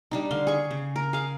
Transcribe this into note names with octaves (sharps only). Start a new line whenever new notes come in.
G3 D4 D#4
D3 F5 C6
G#4 C#6
C#3
A#4
G#4 F5